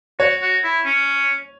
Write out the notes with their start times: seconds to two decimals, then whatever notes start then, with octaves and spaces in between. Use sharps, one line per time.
0.19 F#4 C#5
0.42 F#4
0.64 E4
0.86 C#4